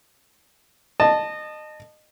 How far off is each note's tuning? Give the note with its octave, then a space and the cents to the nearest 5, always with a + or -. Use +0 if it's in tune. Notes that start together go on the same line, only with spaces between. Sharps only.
D#5 -25 A5 +0